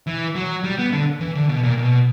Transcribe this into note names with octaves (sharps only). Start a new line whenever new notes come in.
E3
F#3
G3
B3
D3
E3
D3
B2
A#2
B2